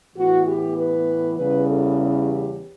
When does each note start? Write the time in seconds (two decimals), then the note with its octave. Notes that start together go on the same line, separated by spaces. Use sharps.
0.15 A2 E3 B3 F#4
0.46 G4
0.76 B4
1.37 E2 C#3 E3 G3 C#4 B4
1.67 A4
1.98 G4